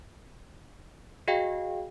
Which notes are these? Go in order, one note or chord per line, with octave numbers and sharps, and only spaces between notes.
F#4 G#4 D#5 F5 G5